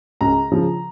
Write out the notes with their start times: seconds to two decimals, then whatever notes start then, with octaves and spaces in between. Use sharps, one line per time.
0.21 C#2 A#5
0.52 C#3 F3 G#3